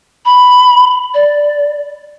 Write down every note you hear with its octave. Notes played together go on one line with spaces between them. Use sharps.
B5
D5